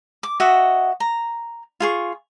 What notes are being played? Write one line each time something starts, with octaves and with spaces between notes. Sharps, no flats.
D6
F#4 D#5 E5 F#5
A#5
F4 G#4 C#6